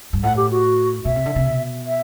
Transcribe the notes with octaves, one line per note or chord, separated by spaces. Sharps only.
G2
A2 F#5
G4
F#4
B2 E5
C3
D3
C3
B2
E5